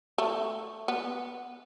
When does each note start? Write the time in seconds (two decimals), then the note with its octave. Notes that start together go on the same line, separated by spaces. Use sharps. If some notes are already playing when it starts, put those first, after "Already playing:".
0.18 A3
0.88 B3